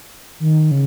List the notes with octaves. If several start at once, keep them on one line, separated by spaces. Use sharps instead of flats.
D#3
C#3